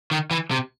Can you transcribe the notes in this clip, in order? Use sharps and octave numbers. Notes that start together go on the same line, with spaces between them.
D#3
E3
C3